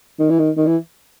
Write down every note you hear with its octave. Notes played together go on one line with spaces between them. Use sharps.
D#3
E3
D#3
D#3
E3